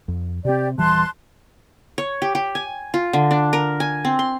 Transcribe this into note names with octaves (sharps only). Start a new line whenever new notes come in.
F2
C3 C4 G4 D5
D#1 E3 G3 A5 C6 F#6
C#5
G4
G4
G#5
F4
D3
D4
A#4
G#5
C4
C6